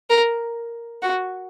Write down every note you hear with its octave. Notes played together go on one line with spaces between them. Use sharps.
A#4
F#4